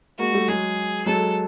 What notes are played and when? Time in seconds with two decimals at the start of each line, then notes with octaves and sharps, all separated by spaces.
0.19 G#3 A#3 F#4
0.33 G3 A3
0.48 F#3 G#3 G#4
1.06 F#3 G#3 A4